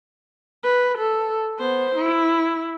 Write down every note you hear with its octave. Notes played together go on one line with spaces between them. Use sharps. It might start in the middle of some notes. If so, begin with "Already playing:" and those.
B4
A4
B3 C5
E4